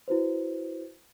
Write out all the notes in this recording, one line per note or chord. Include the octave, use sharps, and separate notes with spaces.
E4 F#4 B4 C5